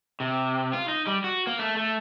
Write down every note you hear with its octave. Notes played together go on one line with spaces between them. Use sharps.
C3
F4
D#4
G3
F#4
A#3
A3
A3